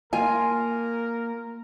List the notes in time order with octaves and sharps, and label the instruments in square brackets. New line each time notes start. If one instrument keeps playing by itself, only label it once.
[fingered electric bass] A#3 [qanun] F4 [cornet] A#4 [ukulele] G#5